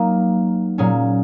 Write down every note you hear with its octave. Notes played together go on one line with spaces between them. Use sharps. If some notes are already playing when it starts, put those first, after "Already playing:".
Already playing: F#3 A#3 D#4 A#4
A#2 F#3 C#4 G#4